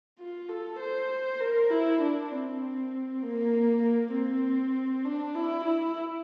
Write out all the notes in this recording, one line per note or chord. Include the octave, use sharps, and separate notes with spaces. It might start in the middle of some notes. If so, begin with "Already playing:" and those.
F4
A4
C5
A#4
E4
D4
C4
A#3
A#3
C4
D4
E4
E4